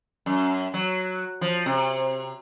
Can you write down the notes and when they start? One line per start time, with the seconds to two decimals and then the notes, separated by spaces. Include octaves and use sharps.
0.26 F#2
0.74 F#3
1.41 F3
1.66 C3